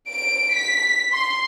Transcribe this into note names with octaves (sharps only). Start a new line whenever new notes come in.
D7
B6
C6